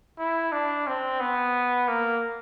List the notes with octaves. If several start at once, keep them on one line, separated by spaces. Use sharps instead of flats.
E4
D4
C4
B3
A#3